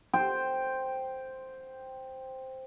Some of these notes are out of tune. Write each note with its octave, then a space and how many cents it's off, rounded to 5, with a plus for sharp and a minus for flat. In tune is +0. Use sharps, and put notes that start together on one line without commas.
C5 +0 G5 +0